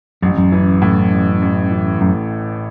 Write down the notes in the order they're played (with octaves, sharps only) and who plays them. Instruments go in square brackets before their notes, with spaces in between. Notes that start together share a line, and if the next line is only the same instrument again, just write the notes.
[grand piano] A1 [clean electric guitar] F#2
[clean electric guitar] F#2
[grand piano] E3
A2
A1
A1
E3
[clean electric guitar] F#2 [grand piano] A2